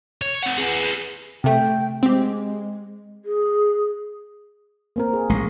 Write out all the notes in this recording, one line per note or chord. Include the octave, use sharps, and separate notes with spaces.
C#5
C4 F#5
G#4 B4
C3 A3 G5
G#3 C4 G4
G#4
A#3 C4 A#4
G#4
A1 G#3